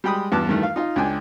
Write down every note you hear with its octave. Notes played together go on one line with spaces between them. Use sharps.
G3 G#3 G5 B5 D#6
E2 G2 A5 D6 F#6
G2 D#3 E3 A3
F5
D#4 F4
C#2 D4 G5 G#5